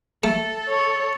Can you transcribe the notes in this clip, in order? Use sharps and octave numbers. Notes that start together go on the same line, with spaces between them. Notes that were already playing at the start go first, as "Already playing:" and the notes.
A3 A4
C#5